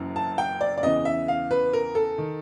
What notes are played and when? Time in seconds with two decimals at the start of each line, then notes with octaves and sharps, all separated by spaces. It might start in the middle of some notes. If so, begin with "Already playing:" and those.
Already playing: F#1 F#2 C#3 E3
0.16 A5
0.38 G5
0.61 D5
0.77 D5
0.83 E2 C#3 E3 D#5
1.05 E5
1.28 F5
1.51 B4
1.73 A#4
1.95 A4
2.18 D#3